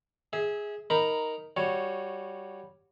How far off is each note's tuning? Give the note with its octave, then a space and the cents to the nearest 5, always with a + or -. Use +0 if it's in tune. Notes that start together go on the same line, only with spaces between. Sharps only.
G#4 +0 E5 -30
D#4 +0 A#4 +0 B5 +5
G3 +0 F#4 -15 C#5 +0